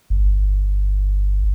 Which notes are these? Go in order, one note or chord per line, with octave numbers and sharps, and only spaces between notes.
G1